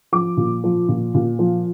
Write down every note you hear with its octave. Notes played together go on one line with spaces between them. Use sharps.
F3 D6
A#2
F3
A#2
A#2
F3